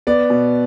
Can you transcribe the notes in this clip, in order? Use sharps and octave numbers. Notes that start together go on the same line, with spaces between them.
B3 D5
B2